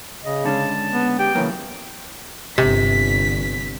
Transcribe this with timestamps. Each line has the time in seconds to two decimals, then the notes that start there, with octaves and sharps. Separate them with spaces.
0.24 C#3 D#5
0.45 D3 G#3 C#4 A5
0.93 B3
1.19 G4 G5
1.35 C#3 E3 F#3 A#3
2.58 G1 C3 B6